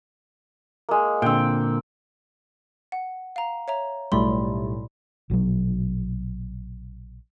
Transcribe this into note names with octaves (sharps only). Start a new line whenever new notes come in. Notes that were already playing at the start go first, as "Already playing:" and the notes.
G#3 A#3
A#2 D3 C4 G5
F#5
F5 A#5
C#5 E5 A#5
B1 A2 G3 D5 B5 C6
A#1 B2 D3 F#3